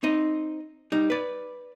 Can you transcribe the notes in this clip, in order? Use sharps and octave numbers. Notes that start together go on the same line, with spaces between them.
C4 D#4 D#5
G3 D#4
B4 D5